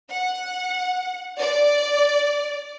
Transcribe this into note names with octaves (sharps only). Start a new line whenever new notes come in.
F#5
D5